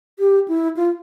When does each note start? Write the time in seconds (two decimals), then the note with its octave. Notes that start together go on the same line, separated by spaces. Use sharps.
0.19 G4
0.48 E4
0.77 F4